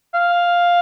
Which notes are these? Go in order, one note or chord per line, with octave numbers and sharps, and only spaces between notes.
F5